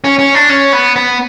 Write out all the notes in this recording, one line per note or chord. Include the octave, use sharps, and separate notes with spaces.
C#4
C#4
D4
C#4
B3
B3